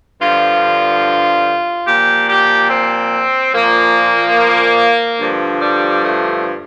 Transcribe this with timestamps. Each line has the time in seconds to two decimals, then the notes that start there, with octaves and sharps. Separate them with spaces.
0.21 G2 D3 F3 F4
1.87 A#2 F3 G4
2.29 G4
2.70 C4
3.54 A#2 F3 A#3
5.20 G2 D3 F3
5.61 G3
6.04 A3